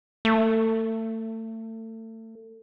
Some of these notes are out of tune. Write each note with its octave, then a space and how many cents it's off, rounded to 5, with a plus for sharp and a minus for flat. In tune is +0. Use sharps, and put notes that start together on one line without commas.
A3 +30